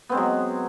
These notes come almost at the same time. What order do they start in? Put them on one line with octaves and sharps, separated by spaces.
B3 C4 G#3 F#3